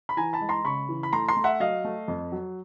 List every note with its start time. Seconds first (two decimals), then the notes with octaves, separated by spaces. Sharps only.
0.09 B5
0.17 E3 G#5 A#5
0.33 A5 B5
0.41 G#3
0.49 A#5 C6
0.65 C#3 B5 C#6
0.89 E3
1.03 B5
1.13 A3 A#5 C6
1.29 A#5 C6
1.36 A3
1.44 E5 F#5
1.60 F#3 D#5 F5
1.84 A3
2.08 F2
2.32 F#3